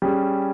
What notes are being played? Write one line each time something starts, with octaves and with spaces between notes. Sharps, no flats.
G3 C#4 G#4